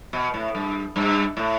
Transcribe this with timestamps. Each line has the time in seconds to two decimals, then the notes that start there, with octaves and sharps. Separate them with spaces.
0.13 B2
0.34 A2
0.55 G2
0.96 G2
1.37 A2